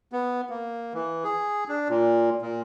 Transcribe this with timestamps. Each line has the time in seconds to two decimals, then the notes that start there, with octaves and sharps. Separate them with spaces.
0.12 B3
0.50 A#3
0.93 E3
1.24 G#4
1.69 D4
1.89 A#2
2.42 A#2